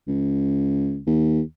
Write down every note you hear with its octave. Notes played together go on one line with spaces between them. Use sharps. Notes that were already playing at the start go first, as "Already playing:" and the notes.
C#2
D#2